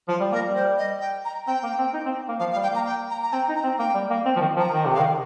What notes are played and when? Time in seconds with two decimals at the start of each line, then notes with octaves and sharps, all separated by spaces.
0.08 F3 F4
0.20 G3
0.32 A#3 A#4
0.43 G3
0.55 C5
0.78 D#5
1.01 G5
1.25 A#5
1.47 C4 G5
1.63 A#3
1.78 C4
1.94 D#4
2.05 C4
2.29 A#3
2.39 F3 F5
2.52 F5
2.56 G3
2.63 G5
2.71 A#3 A#5
2.86 G5
3.10 A#5
3.22 A#5
3.33 C4 G5
3.49 D#4
3.56 A#5
3.63 C4
3.79 A#3 G5
3.94 G3
4.10 A#3
4.25 C4
4.36 F3
4.41 D#3
4.56 F3
4.59 A#5
4.71 D#3 G5
4.86 C3
4.94 F5
4.99 D#3